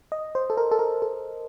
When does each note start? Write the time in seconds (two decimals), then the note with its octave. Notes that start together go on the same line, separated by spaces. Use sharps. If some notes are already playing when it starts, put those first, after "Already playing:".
0.12 D#5
0.35 C5
0.50 A4
0.57 A#4
0.72 A4
0.79 A#4
1.02 A4